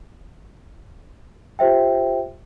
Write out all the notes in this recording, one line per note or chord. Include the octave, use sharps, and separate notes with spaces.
F4 G4 C5 E5 G5